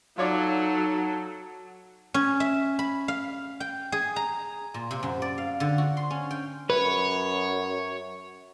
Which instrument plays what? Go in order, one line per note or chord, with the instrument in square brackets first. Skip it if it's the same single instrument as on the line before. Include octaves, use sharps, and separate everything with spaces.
[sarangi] F#3 [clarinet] D#4 [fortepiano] F4 C#5 D5 [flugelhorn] A4
[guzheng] C#4
E5
B5
F5
G5
G#4
A#5
A#2
C3
F#2
D5
F5
D3
F#4
C6
C#4
G5
[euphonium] F#2 [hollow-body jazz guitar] B4 [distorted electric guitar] C#5